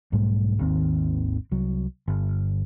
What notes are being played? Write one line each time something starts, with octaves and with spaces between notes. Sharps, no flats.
B1 G#2 G3 A3
G#1 D#2 D#3 C4
C2 F#3
G1